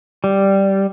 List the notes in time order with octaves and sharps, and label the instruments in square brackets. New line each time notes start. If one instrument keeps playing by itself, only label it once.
[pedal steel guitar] G3